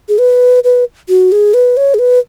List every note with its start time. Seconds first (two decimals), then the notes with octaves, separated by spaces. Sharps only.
0.09 G#4
0.19 B4
0.64 B4
1.09 F#4
1.32 G#4
1.54 B4
1.77 C#5
1.94 G#4
1.99 B4